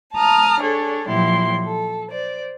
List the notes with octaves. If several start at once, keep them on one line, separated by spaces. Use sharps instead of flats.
A5 A#5 D#6 F6
D4 G#4 A4 C#5
A#2 F3 F#3 E4 G4 C6
A4
C5 D5